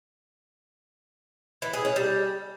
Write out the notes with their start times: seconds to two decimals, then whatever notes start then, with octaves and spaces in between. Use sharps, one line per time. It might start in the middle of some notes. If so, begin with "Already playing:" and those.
1.62 E3
1.73 G#4
1.85 C#4
1.96 G3